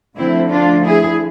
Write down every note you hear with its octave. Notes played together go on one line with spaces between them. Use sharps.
D2 D3 F3 C4 E4
D4 F4
E4 G#4